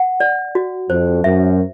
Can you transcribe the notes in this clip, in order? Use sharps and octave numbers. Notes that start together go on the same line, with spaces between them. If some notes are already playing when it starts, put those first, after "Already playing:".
Already playing: F#5
D5
F#4
F2 C5
F#2 E5